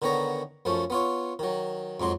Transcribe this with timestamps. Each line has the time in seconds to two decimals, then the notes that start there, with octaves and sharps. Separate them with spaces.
0.02 D3 D#3 B3 C#5 A#5
0.65 F#2 F3 A3 C#4
0.90 B3 F4 C#5
1.39 D#3 F#3
2.00 F2 G#2 F#3 C6